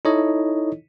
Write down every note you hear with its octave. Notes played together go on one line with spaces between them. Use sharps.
D#4 E4 A4 C#5 D#5